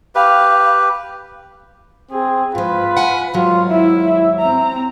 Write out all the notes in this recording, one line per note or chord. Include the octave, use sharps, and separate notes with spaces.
G4 B4 F5
C4 G#4
G#2 F3 F4 B4
F#5 G#5
D#2 G#2 F#3 F4
E4 E5
C4 A#5